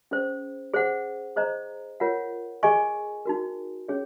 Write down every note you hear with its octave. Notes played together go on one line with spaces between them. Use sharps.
C#4 G#4 C5
G#4 C5 F#5
G#4 C5 D#5 A#5
F4 A#4 C#5 F#5
G#4 D#5 G#5 C#6
D#4 F#4 A#4
C#4 G#4 C#5